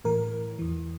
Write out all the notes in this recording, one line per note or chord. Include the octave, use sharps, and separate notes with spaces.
A2 E3 A#4
E2 E3